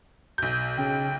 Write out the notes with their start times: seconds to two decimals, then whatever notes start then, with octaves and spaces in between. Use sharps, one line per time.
0.38 B1 G6
0.78 C#3 G5